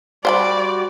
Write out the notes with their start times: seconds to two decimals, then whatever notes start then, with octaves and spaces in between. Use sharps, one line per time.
0.25 G3 F#4 C5 D5 F#5 B5